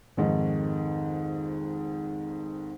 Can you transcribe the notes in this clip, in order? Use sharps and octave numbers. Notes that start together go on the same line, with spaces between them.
F2 G#2 D#3